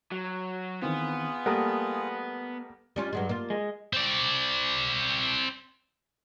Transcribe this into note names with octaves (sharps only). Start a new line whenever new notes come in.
F#3
D#3 E3 B3 C4 F4 G#4
G3 A3 A#3 F#5 A5 D#6
G3 C#4 F4
G2 F#3 G#3
A#3 F4
G#3
C4 D5